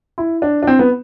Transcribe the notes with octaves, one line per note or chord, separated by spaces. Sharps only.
E4
D4
D4
C4
B3